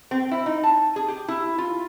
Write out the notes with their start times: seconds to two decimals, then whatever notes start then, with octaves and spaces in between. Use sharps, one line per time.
0.11 C4
0.31 E4
0.46 D#4
0.63 A5
0.96 G#4
1.08 G4
1.28 E4
1.58 F4